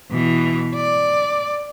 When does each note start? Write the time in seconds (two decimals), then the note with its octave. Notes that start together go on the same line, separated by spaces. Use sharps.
0.12 B2 E3
0.75 D5